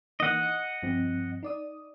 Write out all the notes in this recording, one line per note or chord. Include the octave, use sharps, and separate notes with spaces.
E3 A#3 D#4 D#5 F#5
C#7
G2 F3 C4
D#4 D5 D#6